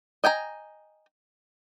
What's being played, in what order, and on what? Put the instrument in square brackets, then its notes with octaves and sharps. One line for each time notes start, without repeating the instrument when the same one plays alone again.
[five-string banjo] D#5 G5 G#5 A#5